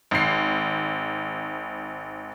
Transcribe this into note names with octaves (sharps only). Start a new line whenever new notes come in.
G#1 C7